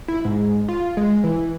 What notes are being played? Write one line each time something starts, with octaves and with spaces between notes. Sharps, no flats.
E4
G#2
F4
G#3
E3